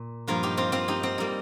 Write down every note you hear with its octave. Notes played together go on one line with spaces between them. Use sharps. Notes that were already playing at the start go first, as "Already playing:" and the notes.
Already playing: A#2
G2 F3 A#3 F4 A#4
D#4 G4
C4 F4
C4 F4
D#4 G4
C4
G3 A#3 D#4